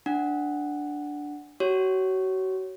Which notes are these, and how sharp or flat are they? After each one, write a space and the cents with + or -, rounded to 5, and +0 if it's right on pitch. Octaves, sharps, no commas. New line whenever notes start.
D4 +0 F#5 +0
F#4 +35 C#5 +0